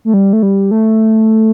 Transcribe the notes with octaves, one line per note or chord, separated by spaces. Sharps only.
A3
G3
A3
G3
A3